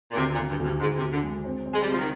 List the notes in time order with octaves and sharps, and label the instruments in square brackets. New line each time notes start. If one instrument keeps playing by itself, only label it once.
[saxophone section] A#2
[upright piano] D2 [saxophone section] C3
[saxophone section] A#2
[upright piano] D2
[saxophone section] G2
[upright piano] D2
[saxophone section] G2
[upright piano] D2 [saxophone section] G#2
[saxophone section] C3
[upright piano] D2
[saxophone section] D3
[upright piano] G#3
C4
C4
[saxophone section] G#3
G3
[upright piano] C3 [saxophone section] F3
[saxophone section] D#3